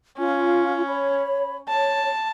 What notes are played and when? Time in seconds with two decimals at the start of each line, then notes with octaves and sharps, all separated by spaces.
0.18 C#4 F4
0.87 C#5 B5
1.68 C#5 A5